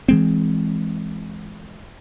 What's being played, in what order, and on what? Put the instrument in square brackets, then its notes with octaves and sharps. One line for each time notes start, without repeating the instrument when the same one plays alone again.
[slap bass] E3 G#3 C4